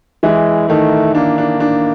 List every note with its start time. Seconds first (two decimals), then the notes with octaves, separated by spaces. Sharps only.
0.23 E3 G#3 E4
0.69 D#3 A3 D#4
1.15 A#3 D4
1.38 D4
1.60 D4